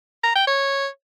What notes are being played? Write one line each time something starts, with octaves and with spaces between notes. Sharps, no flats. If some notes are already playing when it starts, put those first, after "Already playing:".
A#5
G5
C#5